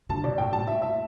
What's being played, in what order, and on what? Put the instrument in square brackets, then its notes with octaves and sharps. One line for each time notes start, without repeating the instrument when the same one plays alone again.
[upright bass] D3 [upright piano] A5
[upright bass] B2 [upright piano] D5
[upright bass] A2 [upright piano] G5
[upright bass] A2 [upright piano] A5
[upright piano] E5
E5